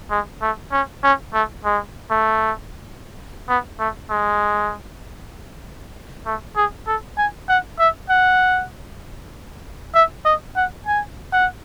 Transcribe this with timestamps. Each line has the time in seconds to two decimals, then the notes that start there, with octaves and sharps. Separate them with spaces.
0.11 G#3
0.42 A3
0.72 C#4
1.03 C#4
1.34 A3
1.65 G#3
2.11 A3
3.49 B3
3.80 A3
4.10 G#3
6.26 A3
6.56 G#4
6.87 A4
7.18 G#5
7.49 F#5
7.79 E5
8.10 F#5
9.95 E5
10.25 D#5
10.56 F#5
10.87 G#5
11.33 F#5